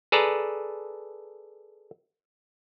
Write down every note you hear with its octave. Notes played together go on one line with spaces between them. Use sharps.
G#4 A4 B4 D5 A5 A#5